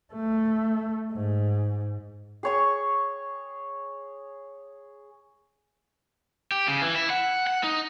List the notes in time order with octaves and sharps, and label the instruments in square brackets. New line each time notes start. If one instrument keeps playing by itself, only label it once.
[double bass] A3
G#2
[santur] G#4 C#5 C#6
[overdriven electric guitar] G4
C#3
E3
E4
F#5
F#5
D#4